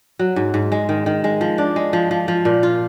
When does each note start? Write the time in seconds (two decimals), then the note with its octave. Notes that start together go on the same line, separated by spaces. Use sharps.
0.19 F#3
0.36 G#2
0.54 G#2
0.72 G#3
0.89 D#3
1.06 D#3
1.24 G#3
1.41 F3
1.58 D4
1.76 G#3
1.93 F3
2.11 F3
2.28 F3
2.45 A#2
2.63 F4